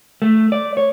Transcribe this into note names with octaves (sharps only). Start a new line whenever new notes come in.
A3
D5
C#5